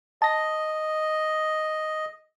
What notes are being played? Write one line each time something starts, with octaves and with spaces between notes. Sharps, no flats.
D#5 A5 A#6